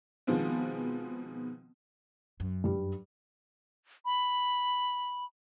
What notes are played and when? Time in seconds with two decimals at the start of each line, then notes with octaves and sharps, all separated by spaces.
0.27 B2 D#3 F3 G#3 B3 C4
2.40 F#2
2.64 G2 G3
4.05 B5